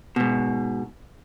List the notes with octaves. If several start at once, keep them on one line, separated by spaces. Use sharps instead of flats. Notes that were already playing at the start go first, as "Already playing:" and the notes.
G#2 B2